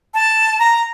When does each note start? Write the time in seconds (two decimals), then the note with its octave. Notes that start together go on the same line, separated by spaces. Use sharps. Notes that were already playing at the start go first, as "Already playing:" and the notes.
0.14 A5
0.59 A#5